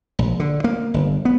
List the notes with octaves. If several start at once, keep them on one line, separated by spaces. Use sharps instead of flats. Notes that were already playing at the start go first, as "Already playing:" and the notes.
A#1
D3
A#3
G1
B3